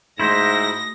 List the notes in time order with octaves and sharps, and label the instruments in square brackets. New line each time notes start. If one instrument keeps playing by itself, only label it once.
[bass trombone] G#2 [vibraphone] A3 F#4 D#6 [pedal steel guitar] E4 C5 [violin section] A#6